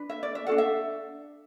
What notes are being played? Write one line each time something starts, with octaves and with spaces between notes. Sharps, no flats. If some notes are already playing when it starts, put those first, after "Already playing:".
Already playing: D4 B4
E5
D5
E5
F#4 A4 F#5
D4
E5